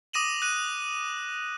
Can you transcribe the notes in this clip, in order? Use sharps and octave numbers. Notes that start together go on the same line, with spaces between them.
D6 D#6 A#6 D#7 E7 F#7
F#6 D#7